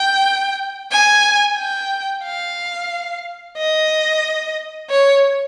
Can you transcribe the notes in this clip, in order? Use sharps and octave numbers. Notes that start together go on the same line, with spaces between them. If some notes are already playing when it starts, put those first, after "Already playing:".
Already playing: G5
G#5
G5
F5
D#5
C#5